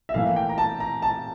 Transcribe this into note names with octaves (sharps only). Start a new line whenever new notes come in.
E5
A2 E3 A#3 F5
G5
A#5
A5
A#5
A5